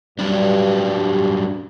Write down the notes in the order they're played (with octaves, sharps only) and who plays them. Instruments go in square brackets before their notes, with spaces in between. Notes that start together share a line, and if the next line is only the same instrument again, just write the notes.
[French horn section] G2 [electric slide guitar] F#3 G3 D4